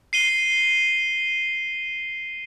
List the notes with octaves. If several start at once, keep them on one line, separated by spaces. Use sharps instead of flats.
C7 D#7 G7